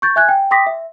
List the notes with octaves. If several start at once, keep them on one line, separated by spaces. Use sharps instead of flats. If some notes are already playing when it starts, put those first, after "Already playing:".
C#6 G6 A6
E5 G#5 F#6 G#6
G5
G5 C6 D6 D#6 A#6 B6
E5